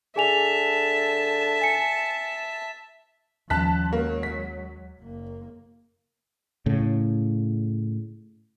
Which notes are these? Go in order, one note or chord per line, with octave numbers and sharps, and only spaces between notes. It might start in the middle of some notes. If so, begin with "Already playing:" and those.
D3 G#4 E5 G#5 A5 F7
G#5 C#7
D#2 F3 G3 C#4 A5 F#6 B6
F#3 G#3 A#3
B6
F#1 A#3
A2 C#3